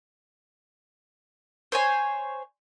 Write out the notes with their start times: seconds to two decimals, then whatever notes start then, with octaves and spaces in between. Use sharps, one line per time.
1.72 C5 C#5 G#5